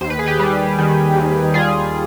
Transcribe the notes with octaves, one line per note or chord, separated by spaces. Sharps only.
D#2 C5
B4
G#4
G4 B4
G3
D#3
D#2
G3 F4 G#4